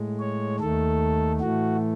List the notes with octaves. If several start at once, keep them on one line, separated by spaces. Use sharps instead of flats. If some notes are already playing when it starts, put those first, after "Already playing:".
Already playing: A2 G#3
C#5
D#2 D#3 A3 A4
A2 E3 A3 F#4